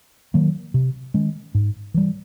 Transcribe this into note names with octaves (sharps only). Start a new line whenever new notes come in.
D#3 F#3 A#3
C3
D#3 G#3 C#4
G#2
E3 G3